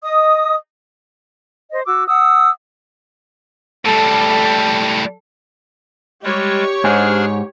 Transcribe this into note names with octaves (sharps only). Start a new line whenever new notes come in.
D#5 D#6
C5 D#5
F#4 D6 E6
F#5 D#6 E6
A2 G3 A4
G3 G#3 G4 C#5
G#2 D4 G#4 G#5 F6